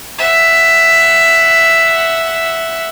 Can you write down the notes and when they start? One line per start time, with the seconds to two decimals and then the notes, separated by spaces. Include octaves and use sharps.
0.18 E5 F#5